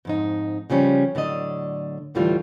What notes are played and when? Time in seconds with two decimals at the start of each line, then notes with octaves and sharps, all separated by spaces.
0.05 F2 G#2 D#4
0.70 C#3 F3 G3 C#4
1.15 A2 D3 F#3 D5 D#5
2.15 D2 A2 D3 E3 G3 F4